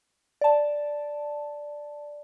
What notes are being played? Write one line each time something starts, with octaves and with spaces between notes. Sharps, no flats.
D5 A5